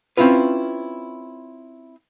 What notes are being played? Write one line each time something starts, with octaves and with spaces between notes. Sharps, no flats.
C4 C#4 E4 F4 B4